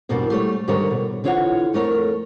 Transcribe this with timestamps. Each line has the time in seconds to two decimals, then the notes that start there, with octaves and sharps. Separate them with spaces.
0.09 E2 G2 B2 G3 A#3 D4
0.30 G3 A3 C#5
0.68 G#2 D3 D#3 G3 A#4 C#5
0.91 B2
1.24 D3 E3 F4 C#5 D#5 F#5
1.73 F2 A3 A#4 C#5